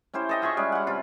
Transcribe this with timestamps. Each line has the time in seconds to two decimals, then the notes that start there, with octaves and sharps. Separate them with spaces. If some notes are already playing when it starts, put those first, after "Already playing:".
0.14 C#4 E4 G4 C5
0.29 A4 D#5 G5
0.42 F4 G#4 E5 C#6
0.57 G3 G#3 C#4
0.72 G3 F#5
0.87 C3 F4